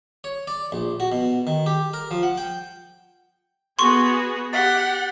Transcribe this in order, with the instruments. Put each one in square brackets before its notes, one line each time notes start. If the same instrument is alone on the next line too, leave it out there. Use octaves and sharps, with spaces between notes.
[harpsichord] C#5
D5
A#1
F#4
B2
D#3
G4
A#4
F3
F#5
G5
[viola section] B3 F#4 G#4 [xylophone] C6 C#6
[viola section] G4 [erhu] F#5 [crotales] A6 B6 G7